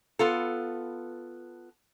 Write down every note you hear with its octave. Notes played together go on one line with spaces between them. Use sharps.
B3 F4 A4